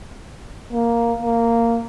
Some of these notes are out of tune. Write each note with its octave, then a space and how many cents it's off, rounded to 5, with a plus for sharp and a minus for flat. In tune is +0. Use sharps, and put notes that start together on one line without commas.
A#3 +5
A#3 -10